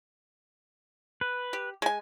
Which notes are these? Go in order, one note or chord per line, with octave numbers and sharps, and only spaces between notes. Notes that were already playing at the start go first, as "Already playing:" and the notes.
B4
G4
G#3 G#5